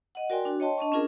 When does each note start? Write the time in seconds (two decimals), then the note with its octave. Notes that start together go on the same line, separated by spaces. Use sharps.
0.15 D#5 F#5
0.30 F#4 A#4 D5 G5 G#5 C6
0.45 D4 F#4
0.60 C#5 D#5 G5 A5 C6
0.78 D4 D#5 A5 C#6
0.92 C#4 D4 F4 G#4 A#4